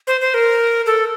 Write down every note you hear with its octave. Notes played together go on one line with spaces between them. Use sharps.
C5
C5
A#4
A4